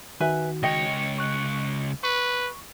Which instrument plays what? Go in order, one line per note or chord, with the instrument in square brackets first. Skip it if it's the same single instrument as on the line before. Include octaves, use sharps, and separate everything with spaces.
[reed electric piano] D#3 F#4 [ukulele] B4 E5 G#5
[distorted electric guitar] C#2 C#5 [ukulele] D#5 G5
[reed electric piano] C#6 F#6
[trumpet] B4 [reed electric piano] C#6